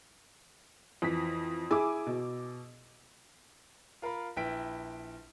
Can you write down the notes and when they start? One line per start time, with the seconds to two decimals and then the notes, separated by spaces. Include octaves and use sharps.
1.02 F2 E3 B6
1.71 E4 G#4 G#5 D6 E6
2.07 B2
4.02 F4 A#4 F5 B5
4.36 A#1 E4 B4 G5 B6 D7